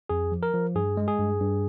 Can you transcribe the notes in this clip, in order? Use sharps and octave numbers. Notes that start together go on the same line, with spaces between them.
F2 G#4
F3
A#4
F3
G2 G#4
G#3
G#4
G2
G2